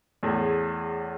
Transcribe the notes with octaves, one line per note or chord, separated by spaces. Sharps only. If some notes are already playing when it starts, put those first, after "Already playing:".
E2 A2 G#4